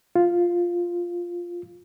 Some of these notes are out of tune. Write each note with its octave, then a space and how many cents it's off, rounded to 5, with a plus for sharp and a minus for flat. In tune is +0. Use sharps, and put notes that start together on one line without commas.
F4 +0